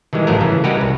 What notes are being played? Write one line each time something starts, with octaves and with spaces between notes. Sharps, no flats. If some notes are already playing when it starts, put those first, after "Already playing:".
D#3 E3 G3 G#3
A1 G2 F3 F#3 A3 A#4
C#3 E3
G3 G#3 F#4 G4 A#4 B4
C2